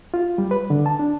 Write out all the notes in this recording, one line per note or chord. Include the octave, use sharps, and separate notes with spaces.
F4
G3
B4
D3
A5
D4